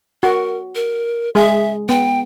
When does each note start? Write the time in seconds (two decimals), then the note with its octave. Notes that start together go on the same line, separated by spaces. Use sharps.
0.23 F#4 A#4
0.75 A#4
1.35 G#3 G#4 E5
1.89 B3 G5